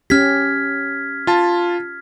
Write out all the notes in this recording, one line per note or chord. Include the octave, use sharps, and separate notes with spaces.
C#4 G4 F6 G#6 B6
F4 A5